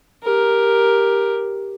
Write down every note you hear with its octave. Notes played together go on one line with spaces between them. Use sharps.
G4 A#4